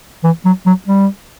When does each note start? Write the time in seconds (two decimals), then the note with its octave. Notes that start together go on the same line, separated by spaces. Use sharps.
0.24 E3
0.45 F#3
0.66 F#3
0.88 G3